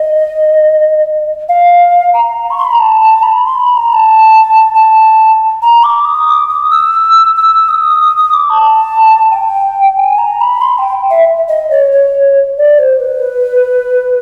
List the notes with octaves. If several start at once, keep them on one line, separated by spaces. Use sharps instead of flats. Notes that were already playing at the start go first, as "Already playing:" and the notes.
Already playing: D#5
F5
A#5
C#6
C6
B5
A#5
A5
A5
B5
C6
B5
A#5
A5
A5
A#5
D6
D#6
D6
D#6
E6
E6
D#6
D#6
D#6
D6
A5
G5
G#5
A#5
B5
C6
G5
E5
D#5
C#5
C#5
D5
C5
B4